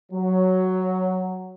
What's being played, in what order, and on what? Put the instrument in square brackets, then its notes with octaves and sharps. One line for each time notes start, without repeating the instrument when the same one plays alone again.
[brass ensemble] F#3